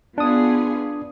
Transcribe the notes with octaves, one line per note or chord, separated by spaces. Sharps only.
B3 D4 F4 G#4 D#6